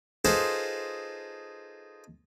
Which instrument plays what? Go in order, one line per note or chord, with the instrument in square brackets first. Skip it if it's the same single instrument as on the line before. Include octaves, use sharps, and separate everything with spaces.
[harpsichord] D#4 F4 G#4 A4 B4 C5